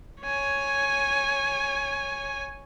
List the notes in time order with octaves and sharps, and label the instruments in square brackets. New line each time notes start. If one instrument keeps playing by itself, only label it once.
[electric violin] C#5 G#5